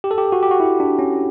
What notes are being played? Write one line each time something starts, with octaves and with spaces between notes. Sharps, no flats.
G4
A4
G4
F#4
G4
F#4
E4
D4
C#4